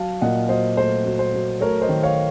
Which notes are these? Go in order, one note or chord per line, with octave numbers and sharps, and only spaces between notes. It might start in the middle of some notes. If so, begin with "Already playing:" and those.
Already playing: F#3 F5 A5
A#2 D#5 F#5
F#3 C5 D#5
A3 C5
F#3
C5
F#3
A3 A#4 C#5
C5 D#5
D#3
C#5 F5